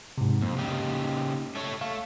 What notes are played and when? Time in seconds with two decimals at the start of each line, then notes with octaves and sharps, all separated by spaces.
0.18 G#2 C3
0.42 F2 A#3
0.58 C#3 D#4 G4
1.55 A3 C#5
1.81 A3 F5